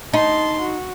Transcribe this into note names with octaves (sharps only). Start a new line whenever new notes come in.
D#4 A5 C6
F#4